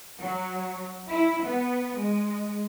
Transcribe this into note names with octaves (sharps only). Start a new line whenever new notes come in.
F#3
E4
B3
G#3